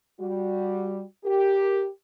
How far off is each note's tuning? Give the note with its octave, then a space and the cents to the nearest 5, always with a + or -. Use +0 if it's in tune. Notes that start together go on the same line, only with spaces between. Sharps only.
G3 +0 F#4 -15
G4 +0 A#4 +0